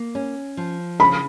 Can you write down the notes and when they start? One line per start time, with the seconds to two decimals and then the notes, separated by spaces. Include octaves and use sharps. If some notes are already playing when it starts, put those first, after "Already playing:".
Already playing: A#3
0.15 C#4
0.57 F3
1.00 C#3 B5